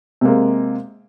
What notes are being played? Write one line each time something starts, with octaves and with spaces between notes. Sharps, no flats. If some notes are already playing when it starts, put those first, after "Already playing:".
C3 G#3 A#3